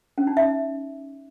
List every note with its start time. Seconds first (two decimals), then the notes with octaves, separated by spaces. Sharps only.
0.18 C#4
0.27 D#4
0.37 E5